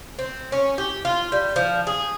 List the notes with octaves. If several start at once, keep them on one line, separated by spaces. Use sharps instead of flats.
C4
C#4
G4
F4
G3
F3
G#4